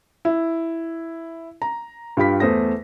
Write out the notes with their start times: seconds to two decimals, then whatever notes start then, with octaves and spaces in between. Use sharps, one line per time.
0.25 E4
1.62 A#5
2.17 G2 F4 G4 B5 B6
2.40 E2 A3 C5 D#6 A#6